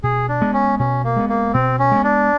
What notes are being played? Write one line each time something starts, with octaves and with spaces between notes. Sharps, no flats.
B2 G#4
D4
G#3 B3
C#4
B2 C#4
A#3
G#3 B3
A#3
B2 C4
C#4
G#3 B3
D4